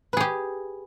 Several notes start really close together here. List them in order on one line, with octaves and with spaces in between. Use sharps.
B4 G#4 G4